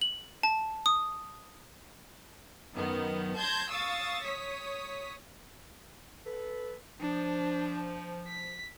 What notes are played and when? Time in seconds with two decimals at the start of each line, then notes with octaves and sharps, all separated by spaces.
0.01 F#7
0.43 A5
0.86 D#6
2.75 F#2 D#3 B3
3.37 A5 C6 G6 G#6 A#6
3.69 F5 C#6 D#6 E6 A6
4.23 C#5 D#6 B6
6.26 A4 B4
7.01 F3 D4
8.28 B6